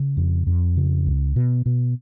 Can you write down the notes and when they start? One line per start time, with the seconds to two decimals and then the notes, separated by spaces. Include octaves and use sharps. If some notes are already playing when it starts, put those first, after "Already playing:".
Already playing: C#3
0.17 F2
0.47 F2
0.77 C#3
1.06 C#2
1.36 B2
1.66 B2